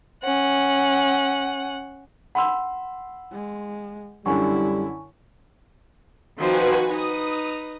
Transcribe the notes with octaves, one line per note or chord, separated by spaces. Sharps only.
C#4 F#5
F#5 B5 C6 E6
G#3
F#2 D3 G3 E4 G#5 C#6
D#3 F3 C4 F#4 B4 G#5
D#4 B4 D#6